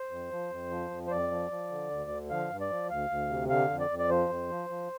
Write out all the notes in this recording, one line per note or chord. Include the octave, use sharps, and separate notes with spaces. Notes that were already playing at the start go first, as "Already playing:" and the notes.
Already playing: C5
F2
F3
F2
F3
F2
C5
F2 D5
F3
F3
D3
D2
D3
F3 F5
G2
D5
F3
D2 F5
D2
C3
D3 F5
F2
D5
F2
D5
F3 C5
F2
F3
F3